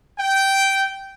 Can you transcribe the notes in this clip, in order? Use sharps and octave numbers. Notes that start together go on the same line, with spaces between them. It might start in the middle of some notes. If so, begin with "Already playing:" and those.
G5